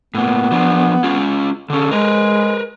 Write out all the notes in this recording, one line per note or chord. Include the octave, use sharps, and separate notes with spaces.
A2 A#3 B3
F3 D4
C#4 F4
D3 C#4 A4
G#3 A#4 B4